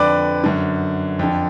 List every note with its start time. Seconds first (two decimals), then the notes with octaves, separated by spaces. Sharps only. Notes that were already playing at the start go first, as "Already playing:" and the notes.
Already playing: F2 D3 B4 D5 D6
0.44 F#2 D3
1.19 F2 D3